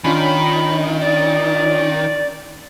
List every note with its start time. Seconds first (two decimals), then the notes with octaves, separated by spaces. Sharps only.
0.04 D#3 C#4 D4 F4 B5
1.01 D5